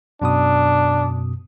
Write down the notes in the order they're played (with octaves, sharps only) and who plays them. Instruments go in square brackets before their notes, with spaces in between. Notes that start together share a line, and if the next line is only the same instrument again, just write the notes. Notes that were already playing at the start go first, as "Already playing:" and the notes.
[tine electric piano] F#2 B2 D#6 [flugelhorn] D4